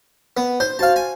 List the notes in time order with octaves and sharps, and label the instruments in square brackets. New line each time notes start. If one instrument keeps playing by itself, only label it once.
[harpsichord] B3
[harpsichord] C5 [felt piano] G6
[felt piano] F#4 C5 [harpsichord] F5 A5
[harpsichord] G#5